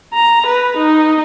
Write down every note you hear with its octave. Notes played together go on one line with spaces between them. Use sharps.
A#5
B4
D#4